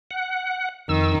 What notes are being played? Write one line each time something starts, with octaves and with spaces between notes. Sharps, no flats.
F#5
F2 D#3 E6